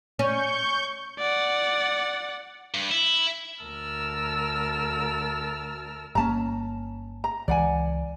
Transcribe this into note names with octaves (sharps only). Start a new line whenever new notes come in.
C#4 C#6 G6
D5 F#5
G2
E4
D2 A#4 A5 E6 F6
G1 A#3 C#4 A5 A#5
A#5
C#2 E3 D5 F#5 G#5